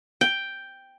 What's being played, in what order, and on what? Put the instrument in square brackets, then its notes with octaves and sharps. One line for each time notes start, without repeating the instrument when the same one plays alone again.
[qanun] G5